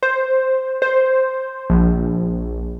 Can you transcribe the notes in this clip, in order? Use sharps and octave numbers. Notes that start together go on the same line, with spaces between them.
C5
C5
A#1